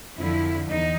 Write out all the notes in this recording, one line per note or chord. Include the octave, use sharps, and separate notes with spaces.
F2 D3 F3 E4
E2 D#4